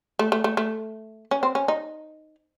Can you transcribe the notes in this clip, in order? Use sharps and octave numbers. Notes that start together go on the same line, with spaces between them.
A3
A3
A3
A3
C#4
C4
C#4
D#4